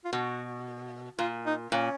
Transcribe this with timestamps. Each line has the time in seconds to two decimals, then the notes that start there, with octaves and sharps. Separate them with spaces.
0.05 F4
0.13 B2 F#4
1.19 A#2 F4
1.46 D#4
1.72 A#2 C#4